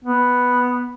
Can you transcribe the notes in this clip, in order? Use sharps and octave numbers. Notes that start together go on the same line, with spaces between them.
B3